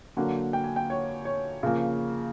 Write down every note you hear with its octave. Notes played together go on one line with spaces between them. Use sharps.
D3 F#3 A#3 F#5
G5
G#5
G5
C#5
C#5
C#3 F3 A#3